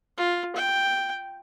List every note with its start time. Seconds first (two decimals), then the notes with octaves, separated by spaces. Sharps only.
0.18 F4
0.56 G5